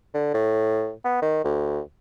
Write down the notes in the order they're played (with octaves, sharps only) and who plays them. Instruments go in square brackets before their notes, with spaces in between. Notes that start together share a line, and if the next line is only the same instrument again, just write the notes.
[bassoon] D3
A2
B3
D#3
D2